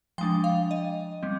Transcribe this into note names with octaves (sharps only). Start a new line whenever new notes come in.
F3 G#3 D4 G5
F5
D#5
G3 C4